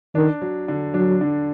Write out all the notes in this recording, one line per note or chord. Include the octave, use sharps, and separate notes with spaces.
D#3 D4
F#3
D3
F#3 D4
D3